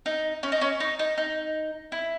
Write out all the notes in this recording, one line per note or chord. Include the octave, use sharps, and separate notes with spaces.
D#4
C#4
D#4
C#4
D#4
D#4
D#4
E4